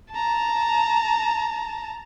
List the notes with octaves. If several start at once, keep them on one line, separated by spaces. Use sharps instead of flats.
A5 A#5